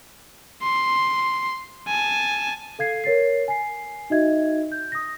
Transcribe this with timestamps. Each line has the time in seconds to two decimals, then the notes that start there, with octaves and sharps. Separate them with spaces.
0.63 C6
1.88 G#5 A5
2.79 A4 F5 G#6 C7
3.04 A#4 C#5 A6 C7
3.48 G#5 C7
4.10 D#4 F#4 D#5 E5 G#6
4.72 G6
4.92 D#6 A#6